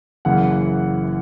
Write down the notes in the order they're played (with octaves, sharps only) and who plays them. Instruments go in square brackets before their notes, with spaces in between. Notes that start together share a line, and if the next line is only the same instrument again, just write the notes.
[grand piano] F#1 F#2 C#3 E3 A#3 F#5